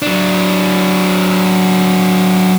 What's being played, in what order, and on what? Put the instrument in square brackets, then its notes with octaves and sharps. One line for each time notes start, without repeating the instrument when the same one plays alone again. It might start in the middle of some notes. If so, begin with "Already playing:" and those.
[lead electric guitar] F#3 D4